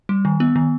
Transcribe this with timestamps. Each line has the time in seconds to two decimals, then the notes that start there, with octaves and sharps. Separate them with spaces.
0.09 G3
0.25 D#3
0.40 B3
0.56 D#3